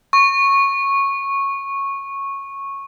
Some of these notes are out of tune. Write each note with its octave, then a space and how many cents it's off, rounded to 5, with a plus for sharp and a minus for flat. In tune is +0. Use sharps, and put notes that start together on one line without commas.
C#6 -10